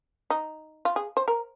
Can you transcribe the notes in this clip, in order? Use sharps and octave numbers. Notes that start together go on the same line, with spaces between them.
D#4
F4
G#4
C5
A#4